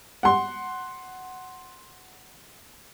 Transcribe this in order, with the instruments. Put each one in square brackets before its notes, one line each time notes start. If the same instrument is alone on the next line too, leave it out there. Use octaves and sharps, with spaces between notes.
[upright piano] F#5 C6